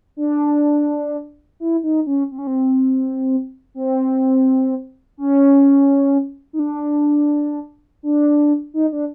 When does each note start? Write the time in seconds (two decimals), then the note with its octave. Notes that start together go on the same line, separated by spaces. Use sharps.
0.17 D4
1.60 E4
1.83 D#4
2.07 C#4
2.32 C4
2.38 C#4
2.47 C4
3.75 C4
5.18 C#4
6.53 D#4
6.59 D4
8.03 D4
8.74 D#4
8.92 D4